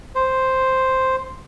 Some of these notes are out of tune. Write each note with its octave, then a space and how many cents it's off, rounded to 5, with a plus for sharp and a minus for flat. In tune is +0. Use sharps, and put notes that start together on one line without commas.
C5 +0